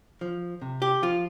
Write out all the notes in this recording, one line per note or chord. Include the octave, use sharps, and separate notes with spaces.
F3
C3
G4
F3 F4